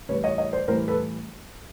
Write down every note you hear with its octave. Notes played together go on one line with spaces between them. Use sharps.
A2 E3 G3 B4 C#5
C#5 D#5
C#5 D#5
C5 D5
A2 E3 G3 A#4 C5
A4 B4